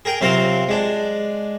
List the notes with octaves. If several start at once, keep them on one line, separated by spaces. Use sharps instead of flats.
G#4 A#4 G5
C3 F#3 C4 F4 A#4 C6
G#3 D4